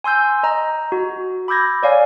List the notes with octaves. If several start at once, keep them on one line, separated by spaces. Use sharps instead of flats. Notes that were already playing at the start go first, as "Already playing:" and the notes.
G#5 C6 E6 G6
D#5 A#5
F#4
B5 D6 E6 G6 G#6 A#6
C#5 D5 F5 G#5